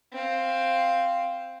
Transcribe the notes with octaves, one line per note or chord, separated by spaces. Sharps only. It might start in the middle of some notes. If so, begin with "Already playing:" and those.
C4 F5